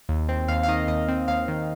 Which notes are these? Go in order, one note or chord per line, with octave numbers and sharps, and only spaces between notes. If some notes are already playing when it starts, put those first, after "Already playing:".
D#2
C4
D#2 F5
F5
D#3 D#5
D#2 D#5
C4
D#2 F5
D#3